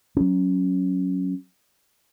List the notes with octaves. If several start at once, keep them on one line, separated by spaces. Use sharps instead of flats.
F#3 C#4